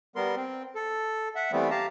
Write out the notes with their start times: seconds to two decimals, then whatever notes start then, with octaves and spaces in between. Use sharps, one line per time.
0.16 G3 B3 A#4 C6
0.36 C4
0.75 A4
1.36 E5 F#5
1.52 E3 G3 A3 B3 C4
1.71 G4 F5 A5 A#5